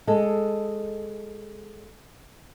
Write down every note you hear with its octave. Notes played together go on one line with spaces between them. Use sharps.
G#3 A4